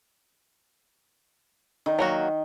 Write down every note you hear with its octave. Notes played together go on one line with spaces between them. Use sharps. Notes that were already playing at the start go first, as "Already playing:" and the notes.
D#3
F#3 A#3 F#4